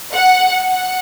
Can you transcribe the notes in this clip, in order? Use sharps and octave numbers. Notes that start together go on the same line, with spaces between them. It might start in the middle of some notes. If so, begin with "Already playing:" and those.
F#5
F#5